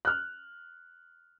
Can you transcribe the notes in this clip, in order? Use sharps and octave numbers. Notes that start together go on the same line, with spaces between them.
F6 F#6